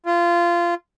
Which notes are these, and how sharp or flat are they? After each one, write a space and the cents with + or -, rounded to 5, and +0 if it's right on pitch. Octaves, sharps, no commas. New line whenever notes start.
F4 -20